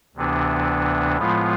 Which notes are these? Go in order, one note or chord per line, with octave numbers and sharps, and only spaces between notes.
D2 C3 E3 B3 D4
A2 F3 G#3 B3 F4